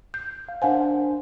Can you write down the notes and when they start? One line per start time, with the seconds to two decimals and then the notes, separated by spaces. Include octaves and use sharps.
0.14 G6
0.49 F5
0.62 D4 A#4 C5 F5 F#5 G#5